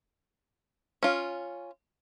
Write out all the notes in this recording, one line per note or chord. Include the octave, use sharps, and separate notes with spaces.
C#4 F4